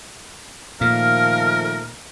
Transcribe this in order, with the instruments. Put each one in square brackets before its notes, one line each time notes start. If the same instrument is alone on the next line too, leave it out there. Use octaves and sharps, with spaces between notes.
[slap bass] A#2 [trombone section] D#3 F3 A3 [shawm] A#4 [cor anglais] F5